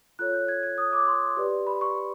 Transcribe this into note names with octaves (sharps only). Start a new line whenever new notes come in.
F4 A4 C#5 F#6
G6
G#6
G#6
D#6
D6
C6
G4 B4 D5
B5
C#6